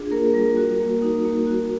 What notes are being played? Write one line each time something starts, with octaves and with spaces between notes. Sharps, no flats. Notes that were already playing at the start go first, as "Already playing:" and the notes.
Already playing: D4 F4 G#4
A#3 A#4
G3
F#4
A#3
D#4
A#3
F#4